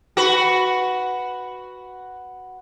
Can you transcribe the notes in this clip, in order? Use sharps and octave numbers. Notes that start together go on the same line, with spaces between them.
F#4 B4